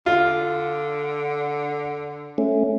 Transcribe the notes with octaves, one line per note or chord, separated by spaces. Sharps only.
D3 F4
A3 C#4